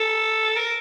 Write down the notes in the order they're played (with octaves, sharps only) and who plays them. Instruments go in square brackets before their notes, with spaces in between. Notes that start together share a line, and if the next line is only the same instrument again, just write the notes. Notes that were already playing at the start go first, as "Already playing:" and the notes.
Already playing: [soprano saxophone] A4
A#4